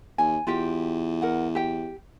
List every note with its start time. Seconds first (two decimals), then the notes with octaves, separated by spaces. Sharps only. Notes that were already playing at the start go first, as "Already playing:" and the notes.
0.18 D#2 G#5
0.47 E2 F4 G4 G5
1.22 A#4 F#5
1.55 G4 G5